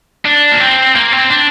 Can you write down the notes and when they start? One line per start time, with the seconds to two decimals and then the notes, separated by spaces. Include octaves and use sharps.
0.25 D4
0.52 A#3
0.60 C4
0.95 A#3
1.12 C4
1.30 D4